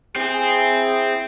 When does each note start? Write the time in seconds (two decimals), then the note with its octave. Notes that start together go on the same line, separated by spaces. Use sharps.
0.16 C4 E4 G#4